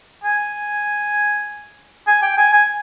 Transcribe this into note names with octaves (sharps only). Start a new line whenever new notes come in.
G#5
G#5
G5
G#5
G#5